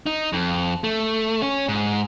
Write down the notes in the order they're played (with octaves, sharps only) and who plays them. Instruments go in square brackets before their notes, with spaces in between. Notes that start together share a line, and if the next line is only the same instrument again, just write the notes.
[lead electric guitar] D#4
F2
A3
C#4
G#2